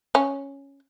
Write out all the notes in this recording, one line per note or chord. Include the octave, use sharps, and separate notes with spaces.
C#4